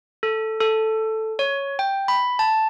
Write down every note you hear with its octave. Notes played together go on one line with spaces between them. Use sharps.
A4
A4
C#5
G5
B5
A5